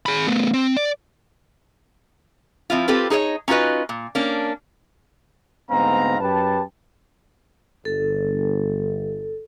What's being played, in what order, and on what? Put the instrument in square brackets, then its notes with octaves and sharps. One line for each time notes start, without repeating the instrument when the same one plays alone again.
[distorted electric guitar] G#4 B5
A3 B3
C4
D5
[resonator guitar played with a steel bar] F3 C4 E4 F4
C4 F4 G4 A4 B4
D#4 G#4 C5 C#5 D#5
C#4 D#4 F4 F#4 B4 D#5
A#2
A#3 C#4 D4
[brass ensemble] D2 G#2 B3 C4 F5 A#5
F#2 G4 B4 A5
[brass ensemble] G1 [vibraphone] A4